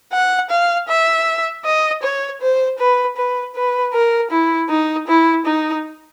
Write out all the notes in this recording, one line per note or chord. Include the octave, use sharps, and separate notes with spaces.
F#5
F5
E5
D#5
C#5
C5
B4
B4
B4
A#4
E4
D#4
E4
D#4